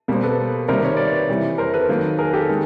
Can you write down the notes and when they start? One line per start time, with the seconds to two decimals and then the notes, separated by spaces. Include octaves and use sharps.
0.08 B2 G3 A#3
0.14 C5
0.24 A4 B4
0.68 C3 D#3 G3 A#3 A#4 C5
0.84 C#5
0.97 D5
1.10 B4 C#5
1.29 C3 E3 G3
1.58 A#4 C5
1.74 A4 B4
1.89 D#3 F#3 A#3
2.18 G#4 A#4
2.33 G4 A4
2.49 D#3 G#3